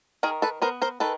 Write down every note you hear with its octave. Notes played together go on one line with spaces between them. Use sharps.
D#3 G#4 A#4
A4 B4
B3 A#4 C5
A#4 C5
D#3 A4 B4